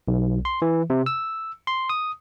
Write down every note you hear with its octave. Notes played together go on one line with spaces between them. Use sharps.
B1
C6
E3
C3
E6
C6
D#6